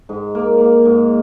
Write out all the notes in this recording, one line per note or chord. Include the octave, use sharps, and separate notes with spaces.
G#2
A#3
A#3
G#2